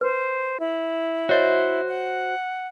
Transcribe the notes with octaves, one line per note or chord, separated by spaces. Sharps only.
B4 C5
E4
F#4 C5 C#5 D#5 E5
F#5